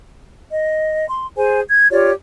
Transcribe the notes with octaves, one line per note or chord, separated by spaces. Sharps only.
D#5
C6
G#4 C5 G#5
G#6
F4 G4 C#5 D5